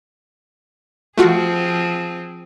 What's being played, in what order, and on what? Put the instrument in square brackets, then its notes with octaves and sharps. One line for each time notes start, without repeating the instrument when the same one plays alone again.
[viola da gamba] F3 C4 G#4 [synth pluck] A3 F4 F#4